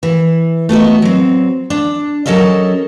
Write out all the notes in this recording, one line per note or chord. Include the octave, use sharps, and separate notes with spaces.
E3
A3 B3 F#4 D#5
F#3 C4
D4
F#3 C#4 A4 A#4 D#5